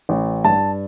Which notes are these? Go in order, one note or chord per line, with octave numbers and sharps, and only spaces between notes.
A1
G2 A5